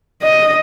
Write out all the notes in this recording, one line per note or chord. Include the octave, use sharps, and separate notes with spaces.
D#5